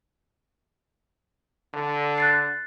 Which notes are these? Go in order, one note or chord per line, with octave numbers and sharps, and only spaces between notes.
D3
F#6 A6 C7